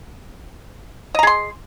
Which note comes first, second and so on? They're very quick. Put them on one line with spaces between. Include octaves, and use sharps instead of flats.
D#5 A#5 G#4 C6